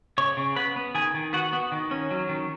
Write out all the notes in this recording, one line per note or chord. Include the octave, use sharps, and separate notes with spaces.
C#3 C#5 C#6
C#3
B3 B4 B5
B3
D#3 G#4 G#5
D#3
B3 F#4 F#5
B3
D#3
C#4
F#3
D#3